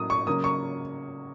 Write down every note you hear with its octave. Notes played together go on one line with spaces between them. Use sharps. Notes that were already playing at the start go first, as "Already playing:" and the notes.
Already playing: A2 F#3 A#3 C#4 D#6
C#6
C#3 F#3 A#3 D#6
C#6